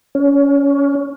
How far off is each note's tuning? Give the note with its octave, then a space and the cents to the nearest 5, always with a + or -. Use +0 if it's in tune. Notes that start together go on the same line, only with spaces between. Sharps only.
C#4 +20